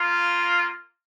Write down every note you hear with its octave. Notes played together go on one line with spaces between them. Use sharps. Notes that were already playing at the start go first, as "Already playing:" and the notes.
Already playing: A#3 F4